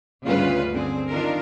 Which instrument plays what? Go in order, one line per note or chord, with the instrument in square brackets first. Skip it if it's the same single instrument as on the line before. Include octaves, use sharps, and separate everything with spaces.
[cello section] D2 G2 C#3 G3 F4 B4
D3 C4 G#4
D#3 D4 F4 A#4